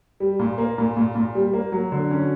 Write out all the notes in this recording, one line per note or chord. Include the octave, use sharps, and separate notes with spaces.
G3
A#2
A#3
A#2
A#2
A#2
G3
A#3
F#3
D3
C#4